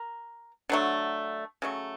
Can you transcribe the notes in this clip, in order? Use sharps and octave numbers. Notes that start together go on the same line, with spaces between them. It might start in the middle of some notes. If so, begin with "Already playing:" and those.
Already playing: A#4
D3 F#3 A3
C#3 F#3 A3